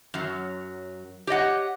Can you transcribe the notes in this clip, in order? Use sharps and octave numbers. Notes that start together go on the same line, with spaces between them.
F#2 F#3
G4 C#5 D#5 F#5